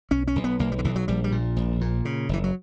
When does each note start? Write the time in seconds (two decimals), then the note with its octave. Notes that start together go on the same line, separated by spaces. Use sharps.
0.11 B1 C#4
0.28 C#4
0.36 B1
0.44 B3
0.59 B1 A#3
0.72 G3
0.79 D3
0.85 B1 E3
0.96 F#3
1.08 A#1 G3
1.24 G3
1.32 A#2
1.56 A#1
1.81 A#2
2.05 C#3
2.29 F#1 E3
2.44 F#3